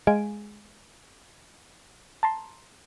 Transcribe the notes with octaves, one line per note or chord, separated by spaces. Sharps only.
G#3 F5 G#5 D7
A5 A#5 C6